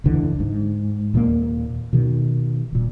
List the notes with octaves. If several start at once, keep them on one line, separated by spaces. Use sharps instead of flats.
F#1 D2 D3 E3
G#2
D#2 A#2 A3 A#3
B2 D#3
D#1 A#2